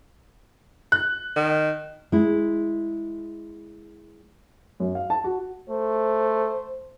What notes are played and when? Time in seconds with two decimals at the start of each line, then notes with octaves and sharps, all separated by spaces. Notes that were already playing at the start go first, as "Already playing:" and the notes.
0.92 F#6
1.36 D#3
2.12 G#3 E4
4.80 F#2
4.95 F5
5.10 A5
5.24 F#4
5.70 A3 C5